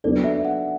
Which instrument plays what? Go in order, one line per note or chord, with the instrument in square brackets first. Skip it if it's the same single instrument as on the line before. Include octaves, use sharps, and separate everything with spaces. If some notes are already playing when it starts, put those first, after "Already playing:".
[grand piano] F#3 B3 D4 A4 [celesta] D5
[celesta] E5
F#5